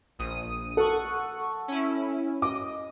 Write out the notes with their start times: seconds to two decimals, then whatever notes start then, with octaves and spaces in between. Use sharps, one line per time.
0.19 A#1 D#6 D#7
0.77 A4 F#5 C#6
1.68 C#4 E4
2.42 D#5 D6